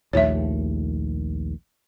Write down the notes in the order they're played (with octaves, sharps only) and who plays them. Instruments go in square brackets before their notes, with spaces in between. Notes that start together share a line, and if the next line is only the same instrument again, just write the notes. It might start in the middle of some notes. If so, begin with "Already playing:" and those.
[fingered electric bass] A#1 D#2 A3 [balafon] C#5 E5